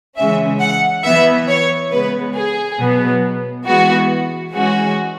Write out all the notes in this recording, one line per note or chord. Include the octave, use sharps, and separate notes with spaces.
C#3 E3 G#3 C#4 E5
F#5
E3 B3 E5
C#5
C#3 G#3 B3 B4
G#4
B2 F#3 B3
E3 G#3 B3 F#4
E3 G#3 C#4 F#4